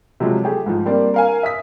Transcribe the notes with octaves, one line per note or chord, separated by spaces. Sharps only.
C3 F3 F#3 G#3
A3 G4 G#4
G#2 F3
G3 A#3 C4 D4
A#4 F5 G#5
E5 D#6 B6